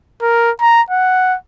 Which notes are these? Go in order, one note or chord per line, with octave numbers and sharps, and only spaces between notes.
A#4
A#5
F#5